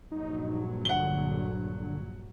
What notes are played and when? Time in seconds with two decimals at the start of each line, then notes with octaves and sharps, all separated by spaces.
0.12 A#1 G2 F#3 D#4
0.85 D3 F#5 G7